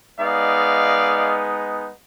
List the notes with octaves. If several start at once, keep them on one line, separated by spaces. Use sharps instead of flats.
G#3 B3 D#4 D5 F5